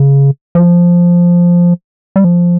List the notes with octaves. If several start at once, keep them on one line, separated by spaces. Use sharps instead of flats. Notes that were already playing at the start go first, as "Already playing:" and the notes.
Already playing: C#3
F3
G3
F3